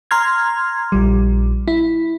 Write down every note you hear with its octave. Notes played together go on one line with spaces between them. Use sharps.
A#5 C6 F6 G#6
A#1 G3
E4